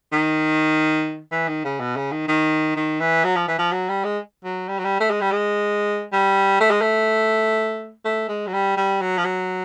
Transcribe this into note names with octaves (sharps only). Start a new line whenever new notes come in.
D#3
E3
D#3
C#3
B2
C#3
D#3
D#3
D#3
E3
F#3
F3
E3
F3
F#3
G3
G#3
F#3
G3
F#3
G3
A3
G#3
G3
G#3
G3
A3
G#3
A3
A3
G#3
F#3
G3
G3
F#3
F3
F#3